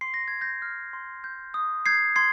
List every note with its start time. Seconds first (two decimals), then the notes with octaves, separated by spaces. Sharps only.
0.01 C6 C7
0.14 A#6
0.28 C6 G#6
0.41 G6 A#6
0.62 F6
0.93 C6
1.24 G6
1.54 D#6
1.86 G6 G#6 C7
2.16 C6 G#6 C7